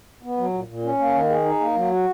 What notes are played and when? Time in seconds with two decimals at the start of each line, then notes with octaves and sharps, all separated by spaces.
0.23 B3
0.37 F#3
0.53 A#2
0.68 A#2
0.84 C#4
0.99 A#3
1.14 D#3
1.29 G#4
1.45 D#4
1.60 A#3
1.75 F#3
1.91 F#4